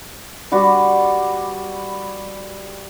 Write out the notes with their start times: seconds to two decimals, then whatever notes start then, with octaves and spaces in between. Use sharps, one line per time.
0.52 G3 F#4 B4 D5